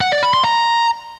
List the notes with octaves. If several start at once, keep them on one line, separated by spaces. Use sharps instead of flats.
F#5
D5
B5
C6
A#5